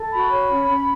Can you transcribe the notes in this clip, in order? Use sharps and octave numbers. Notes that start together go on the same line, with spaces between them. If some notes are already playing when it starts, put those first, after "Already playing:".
Already playing: A4
F#4 B5
C#5
C#4
C#4